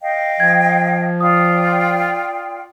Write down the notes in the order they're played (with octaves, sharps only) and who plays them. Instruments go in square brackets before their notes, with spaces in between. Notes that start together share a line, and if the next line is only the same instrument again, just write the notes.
[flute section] D#5 F5 G5
[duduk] F3 [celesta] G#6
[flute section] F4 D5 G5 [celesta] D#6